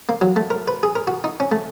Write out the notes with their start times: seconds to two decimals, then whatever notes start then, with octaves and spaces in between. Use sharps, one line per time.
0.09 A#3
0.21 F#3
0.36 A3
0.50 A#4
0.68 B4
0.83 G#4
0.96 A#4
1.07 F#4
1.24 D#4
1.40 C#4
1.52 A3